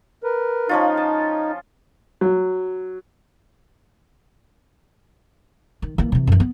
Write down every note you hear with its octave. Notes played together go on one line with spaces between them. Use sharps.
A#4 B4
F3 C#4 D#4 F4
A5
F#3
D#3
E3 A#3
C3 E3
F#2 E3
B3